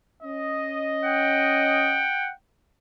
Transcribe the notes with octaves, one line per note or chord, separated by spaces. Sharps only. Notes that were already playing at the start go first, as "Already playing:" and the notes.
C#4 D#5
F#5 G5